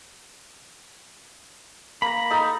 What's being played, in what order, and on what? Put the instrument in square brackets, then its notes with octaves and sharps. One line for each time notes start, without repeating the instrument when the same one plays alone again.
[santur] A#3 A#5 [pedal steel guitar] B5
[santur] D#4 A4 A#5